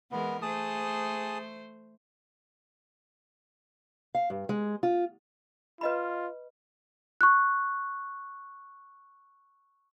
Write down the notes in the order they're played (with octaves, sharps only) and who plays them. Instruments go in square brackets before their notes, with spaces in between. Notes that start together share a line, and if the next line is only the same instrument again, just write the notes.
[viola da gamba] E3 G#3 A#4 [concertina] B3
[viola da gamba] A3 C5 [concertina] G#4 A5 D#6
[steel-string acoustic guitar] F5
G2
G#3
F4
[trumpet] F4 [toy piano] B4 D#5 B5
[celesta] C#6 F#6